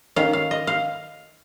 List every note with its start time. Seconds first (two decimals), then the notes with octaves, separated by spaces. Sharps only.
0.16 D#3 C#4 F5
0.33 F5
0.51 D#5
0.67 F5